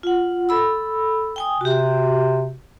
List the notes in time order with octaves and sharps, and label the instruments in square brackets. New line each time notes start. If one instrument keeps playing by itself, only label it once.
[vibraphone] F4 F#5
A4 B5 E6
G5 G#5 D#6
[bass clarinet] C3 [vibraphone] F#4 G4